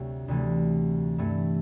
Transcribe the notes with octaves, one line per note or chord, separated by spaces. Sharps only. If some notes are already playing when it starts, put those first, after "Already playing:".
Already playing: D2 C3 F#3 A3
D2 C3 E3 A3
G2 E3 A3